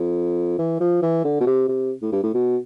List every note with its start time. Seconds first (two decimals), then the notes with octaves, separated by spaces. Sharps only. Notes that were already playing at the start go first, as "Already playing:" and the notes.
Already playing: F2
0.59 E3
0.80 F3
1.02 E3
1.24 D3
1.40 B2
1.46 C3
1.69 C3
2.02 A2
2.12 G2
2.23 A2
2.34 B2